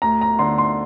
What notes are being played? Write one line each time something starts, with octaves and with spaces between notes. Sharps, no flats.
D2 A#5
A#5
D3 C6
C6